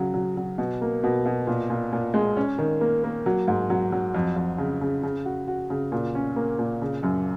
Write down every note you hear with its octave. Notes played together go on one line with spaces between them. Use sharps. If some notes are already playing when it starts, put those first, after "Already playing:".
Already playing: C#3 F#3
F#3
F#3
B2
A#3
B2
B2
A#2
A#2
A#2
G#3
C#4
D#3
A#3
A#3
F#3
G#2
F#3
F#3
F2
F2
C#3
C#3
C#3
F#4
F#4
C#3
A#2
C#4
A#3
A#2
C#3
F#2